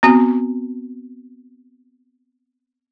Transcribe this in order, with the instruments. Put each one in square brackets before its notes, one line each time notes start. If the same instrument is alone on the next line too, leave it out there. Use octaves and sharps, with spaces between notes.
[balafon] B3 C4 F#4